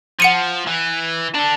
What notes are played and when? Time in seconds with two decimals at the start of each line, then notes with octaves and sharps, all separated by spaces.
0.20 F3 F#5 C#7 D#7
0.67 E3
1.35 D4 A4